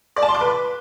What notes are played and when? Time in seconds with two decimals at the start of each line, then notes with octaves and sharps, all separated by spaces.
0.16 D5
0.22 A5
0.29 C6
0.35 D6
0.41 B4